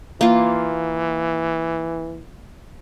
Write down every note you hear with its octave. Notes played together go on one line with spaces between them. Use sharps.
E3 A#3 F4